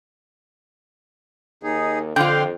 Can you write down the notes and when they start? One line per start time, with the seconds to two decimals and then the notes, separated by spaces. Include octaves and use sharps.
1.63 D#2 D#4 G#4
2.16 F2 D3 F4 F5 G5 C6